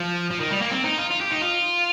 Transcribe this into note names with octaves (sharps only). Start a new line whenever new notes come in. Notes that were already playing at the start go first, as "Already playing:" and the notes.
Already playing: F3
F3
D#3
G3
A#3
C4
D#4
F4
F4
G4
D#4
F4